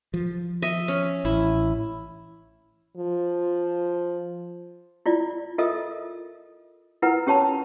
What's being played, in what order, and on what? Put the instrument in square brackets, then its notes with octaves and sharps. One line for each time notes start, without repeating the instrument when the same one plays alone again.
[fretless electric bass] F3
[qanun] D#5 E5
C#4
[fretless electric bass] A1 [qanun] E4
[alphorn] F3
[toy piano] E4 F4 D5
F4 A4 A#4 D#5 E5 D#6
E4 F4 A#4 B4 F#5 A#5
C#4 G4 C#5 A5 B5